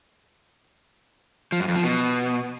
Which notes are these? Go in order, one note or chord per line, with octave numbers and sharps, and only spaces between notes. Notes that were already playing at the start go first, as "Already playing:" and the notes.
F3
F#2
F2
F3
B2